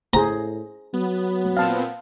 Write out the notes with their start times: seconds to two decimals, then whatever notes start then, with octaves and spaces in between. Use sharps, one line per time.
0.14 A2 G#4 C5 A#5
0.94 F#3 B3
1.57 A#2 B3 C4 F5 A5